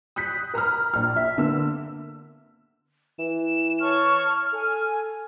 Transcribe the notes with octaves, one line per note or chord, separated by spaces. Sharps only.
D#6 F#6 G6 B6
A#4 A#5 B5 F6
A#1 F6
E5
D3 A#3 B3 E6
E3 E7
C#5 A5 C#6 F6
A4 G#5